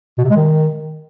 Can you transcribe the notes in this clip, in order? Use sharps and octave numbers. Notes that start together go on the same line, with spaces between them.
B2
C3
G#3
D#3